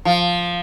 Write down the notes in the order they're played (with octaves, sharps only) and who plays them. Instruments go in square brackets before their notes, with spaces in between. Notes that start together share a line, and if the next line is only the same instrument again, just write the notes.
[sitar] F3